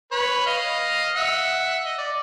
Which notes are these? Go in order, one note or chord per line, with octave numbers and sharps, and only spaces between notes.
B4 C#5
D#5 F5
E5 F#5
D#5
D5